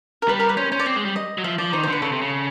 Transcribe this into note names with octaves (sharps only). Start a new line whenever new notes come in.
A#4
G3 B4
A#4
B4
C#4 C5
C#4 C5
D5
C4 C#5
G#3
G3
D#5
F#3
F3 E5
F3 D5
D#3 C5
C5
D3 B4
C#3 A4
C3
C#3